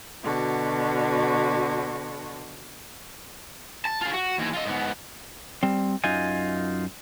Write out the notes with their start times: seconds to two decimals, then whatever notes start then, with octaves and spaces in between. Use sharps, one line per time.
0.23 B2 D3 F#4
3.85 A5
4.01 F4 G#4
4.13 F#4
4.38 D#2 E3
4.53 F4 D#5
4.66 G#2 B3
5.63 G3 C4
6.04 F#2 D#4 F4 G#5